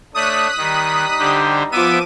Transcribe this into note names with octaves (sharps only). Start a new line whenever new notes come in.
A3 D4 C#5 D#6 F#6 B6
D#3 G3 D#4
D3 G4 C5
F3 B3 E5 D6 D#7